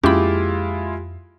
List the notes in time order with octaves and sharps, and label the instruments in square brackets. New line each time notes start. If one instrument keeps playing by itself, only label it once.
[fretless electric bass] F2 A#3 [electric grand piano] G#3 E4 F4 [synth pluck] C#4 B5 [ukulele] G4